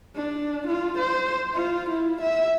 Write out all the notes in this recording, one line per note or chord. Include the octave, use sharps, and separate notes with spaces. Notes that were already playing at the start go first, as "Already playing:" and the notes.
D4
F4
C5
F4
E4
E5